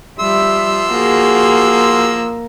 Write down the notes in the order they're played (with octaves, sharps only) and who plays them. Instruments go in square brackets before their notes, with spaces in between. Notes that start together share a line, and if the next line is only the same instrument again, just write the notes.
[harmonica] F3 C6 E6 [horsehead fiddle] G3 E5
[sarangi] A#3 [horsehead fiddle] F#4 G#4